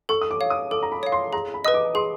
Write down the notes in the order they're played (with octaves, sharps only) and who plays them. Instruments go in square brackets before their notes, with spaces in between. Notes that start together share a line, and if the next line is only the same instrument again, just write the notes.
[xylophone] A4 [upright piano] C#6
[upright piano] D#6
D6
[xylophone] C#5 F5
[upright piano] D#6
[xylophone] A4 [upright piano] D6
[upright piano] A#5
B5
[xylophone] C#5 F5
[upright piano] C6
[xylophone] G#4 [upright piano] A#5
[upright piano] B5
[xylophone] B4 D#5 [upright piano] D#6
[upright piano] D6
[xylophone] G#4 [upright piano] C6